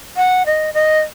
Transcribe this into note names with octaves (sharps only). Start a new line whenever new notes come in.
F#5
D#5
D#5